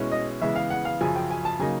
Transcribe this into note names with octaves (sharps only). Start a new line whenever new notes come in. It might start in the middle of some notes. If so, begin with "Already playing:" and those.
Already playing: B2 G#3 C#4 E4
D#5
C#3 E3 G#3 B3 E5
F5
F#5
F5
F#2 C#3 F3 G#5
G5
G#5
A5
C#3 F#3 A#3 D#4 G#5